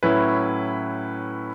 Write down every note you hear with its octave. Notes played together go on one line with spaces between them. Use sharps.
A2 F#3 C#4 E4 B4